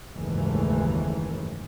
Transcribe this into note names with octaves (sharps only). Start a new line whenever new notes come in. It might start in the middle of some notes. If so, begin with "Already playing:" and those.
F#1 D#2 G#2 E3 G#3 A3